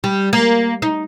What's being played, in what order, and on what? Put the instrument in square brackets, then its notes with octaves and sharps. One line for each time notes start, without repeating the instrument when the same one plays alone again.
[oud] G3
A#3
D#4